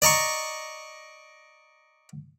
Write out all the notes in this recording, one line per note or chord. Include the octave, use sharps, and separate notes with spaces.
D5 D#5 A#5 C#6